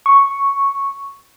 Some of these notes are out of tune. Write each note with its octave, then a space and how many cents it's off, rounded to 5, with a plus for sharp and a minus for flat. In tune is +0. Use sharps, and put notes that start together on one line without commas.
C#6 +0